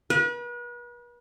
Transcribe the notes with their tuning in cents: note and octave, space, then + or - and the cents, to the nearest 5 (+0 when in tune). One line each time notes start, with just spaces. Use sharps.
B4 -40